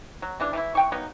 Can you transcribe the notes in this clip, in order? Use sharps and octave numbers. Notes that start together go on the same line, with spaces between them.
F#3
C#3 E3 D4
E3 A3 E4
E3 G5 C#6
F#3 A#3 B3 D#4